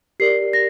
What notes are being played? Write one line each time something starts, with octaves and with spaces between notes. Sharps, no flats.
G4 A#4 D5 C7
A#6